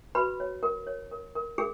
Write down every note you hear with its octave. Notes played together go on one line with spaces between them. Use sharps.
F#4 B4 B5
C#5
A#4
C#5
A#4
A#4
G#4 A#4